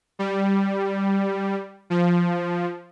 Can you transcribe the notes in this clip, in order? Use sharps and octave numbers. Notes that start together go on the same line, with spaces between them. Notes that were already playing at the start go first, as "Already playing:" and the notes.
G3
F3